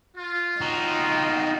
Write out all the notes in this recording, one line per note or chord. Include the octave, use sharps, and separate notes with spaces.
F4
D#4 F#4 D#5 G5